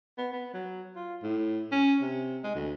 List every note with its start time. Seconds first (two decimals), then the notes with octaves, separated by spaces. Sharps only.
0.18 B3
0.33 B3
0.54 F#3
0.96 F4
1.23 A2
1.72 C#4
2.02 C3
2.44 G#3
2.55 D2